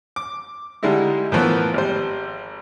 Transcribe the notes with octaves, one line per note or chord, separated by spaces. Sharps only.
D6
D3 G3 G#3 D#4 E4
A2 E3 F3 A#3 B3
G#1 G3 C5